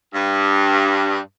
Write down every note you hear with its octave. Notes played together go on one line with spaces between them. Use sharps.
G2